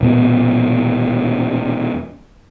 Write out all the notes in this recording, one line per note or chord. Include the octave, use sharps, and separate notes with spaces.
E1 A#2 B3